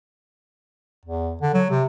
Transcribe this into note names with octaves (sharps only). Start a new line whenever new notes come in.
E2
D3
F#3
C3